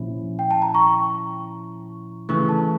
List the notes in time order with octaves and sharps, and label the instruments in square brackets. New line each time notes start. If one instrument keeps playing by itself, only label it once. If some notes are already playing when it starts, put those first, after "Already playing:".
Already playing: [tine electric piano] A#2 F3 C#4 E4
[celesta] G5
A5
A#5
C#6
[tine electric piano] C#3 E3 A3 [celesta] C#6
[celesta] A5